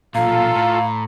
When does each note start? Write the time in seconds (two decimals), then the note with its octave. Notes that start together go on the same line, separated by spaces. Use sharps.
0.15 B1 A#2 F4 A4 F5 A#5
0.56 A2